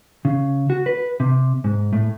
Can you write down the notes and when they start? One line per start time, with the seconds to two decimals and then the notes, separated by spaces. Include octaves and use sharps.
0.25 C#3
0.70 F#4
0.86 B4
1.20 C3
1.64 G#2
1.93 A2